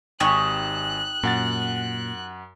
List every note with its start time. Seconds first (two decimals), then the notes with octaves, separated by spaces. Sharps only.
0.20 G#1 D#4 G4 G#5 C#6 F#6
1.23 F#2 A#2 F#5 A6